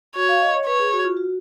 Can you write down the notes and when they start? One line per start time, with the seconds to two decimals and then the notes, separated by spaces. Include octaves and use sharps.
0.15 F#4 C#5
0.29 F5
0.41 D#5
0.54 C#5
0.66 B4 C#5
0.80 G#4
0.92 F#4
1.05 F4
1.17 F#4